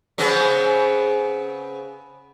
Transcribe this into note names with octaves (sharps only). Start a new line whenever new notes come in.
C#3 B3 C4